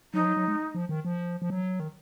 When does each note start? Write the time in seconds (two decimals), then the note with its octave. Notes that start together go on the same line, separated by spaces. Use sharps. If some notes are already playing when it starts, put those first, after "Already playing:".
0.14 F#3 D#4
0.19 F3
0.25 F#3
0.37 F#3
0.48 G#3
0.75 F3
0.89 D#3
1.05 F3
1.42 F3
1.50 F#3
1.80 D#3